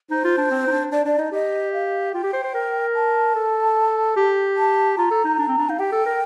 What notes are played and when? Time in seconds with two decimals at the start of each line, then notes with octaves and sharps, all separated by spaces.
0.10 D#4 C5
0.25 F4
0.38 D4
0.51 C4
0.67 D#4
0.72 D4
0.92 D4 D5
1.05 D4 D5
1.18 D#4 D#5
1.32 G4 D#5
1.73 F5
2.13 F4 G5
2.24 G4
2.34 C5
2.44 C5
2.54 A#4
2.95 A5
3.35 A4
4.17 G4
4.56 A5
4.97 F4 A#5
5.11 A4
5.25 D#4
5.39 D4
5.48 C4
5.58 D4
5.69 D#4 F5
5.79 G4 G5
5.92 A4
6.06 A#4